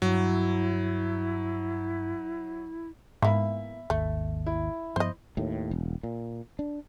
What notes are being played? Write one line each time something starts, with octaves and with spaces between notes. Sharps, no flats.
G2 F#3 E4
G#2 E3 A#3 B3 E5 B5
G#1 D#2 A3
E4
G2 F3 B3 C5 D#5
D#2 A2
E1
A#2
D4